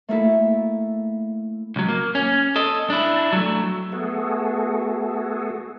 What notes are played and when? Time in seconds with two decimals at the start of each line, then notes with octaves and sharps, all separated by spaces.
0.08 A3 A#3 E4 A4
1.76 C#2 F#3
1.89 A#3
2.15 C#4
2.56 A4 D#5
2.90 D4 E4
3.33 F#3 A3
3.92 A3 B3 F#4 G#4 A4